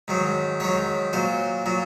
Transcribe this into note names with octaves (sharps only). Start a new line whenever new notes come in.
G#2 D#3 F#3
G#2 D#3 F#3 C#5
A#2 F#3 C5
A#2 F#3